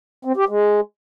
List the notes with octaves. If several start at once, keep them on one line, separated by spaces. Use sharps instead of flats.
C4
G4
G#3